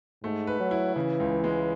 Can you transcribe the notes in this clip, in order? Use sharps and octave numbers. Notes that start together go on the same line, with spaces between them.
G#2 A3
B4
F#3
E4
C#3 E3
C#2
G#3